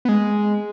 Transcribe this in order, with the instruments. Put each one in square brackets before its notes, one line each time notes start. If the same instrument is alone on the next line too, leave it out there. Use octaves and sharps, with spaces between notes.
[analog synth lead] B3
G#3